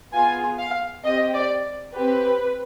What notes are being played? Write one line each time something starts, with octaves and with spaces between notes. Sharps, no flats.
B3 F4 G#4 G#5
F5
C4 G4 D#5
D5
C4 G4 B4